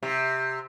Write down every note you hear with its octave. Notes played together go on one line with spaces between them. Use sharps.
C3